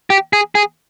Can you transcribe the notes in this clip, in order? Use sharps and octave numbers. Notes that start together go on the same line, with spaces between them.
G4
G#4
G#4